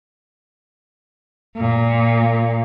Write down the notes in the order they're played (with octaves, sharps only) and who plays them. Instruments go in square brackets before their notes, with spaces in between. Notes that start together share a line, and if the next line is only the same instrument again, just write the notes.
[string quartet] A#2